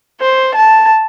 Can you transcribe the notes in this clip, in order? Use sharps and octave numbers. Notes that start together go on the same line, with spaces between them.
C5
A5